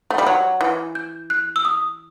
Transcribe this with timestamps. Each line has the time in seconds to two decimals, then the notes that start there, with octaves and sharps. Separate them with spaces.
0.10 A3
0.18 G3
0.27 F#3
0.61 E3
0.95 G6
1.30 F#6
1.56 E6
1.65 D#6